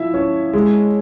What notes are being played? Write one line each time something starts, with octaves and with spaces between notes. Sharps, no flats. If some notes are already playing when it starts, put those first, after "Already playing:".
Already playing: F3 E4 E5
C#4
G#3